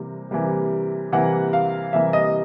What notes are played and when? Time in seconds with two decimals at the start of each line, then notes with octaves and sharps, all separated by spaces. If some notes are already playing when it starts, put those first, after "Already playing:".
Already playing: C3 E3 G3 A#3
0.31 C3 E3 G3 A#3
1.12 C3 E3 G3 A#3 F#5
1.53 F5
1.93 C3 E3 G3 A#3 E5
2.13 D#5